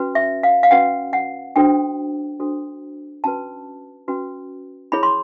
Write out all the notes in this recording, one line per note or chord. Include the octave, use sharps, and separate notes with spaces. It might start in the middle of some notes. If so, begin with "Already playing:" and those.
Already playing: C#4 F#4 B4
E5
F5
F5
C#4 F#4 B4 F#5
F#5
D4 F#4 A4 C5 G5
D4 F#4 A4 C5
C#4 F#4 B4 A5
C#4 F#4 B4
E4 G#4 C#5 B5
C6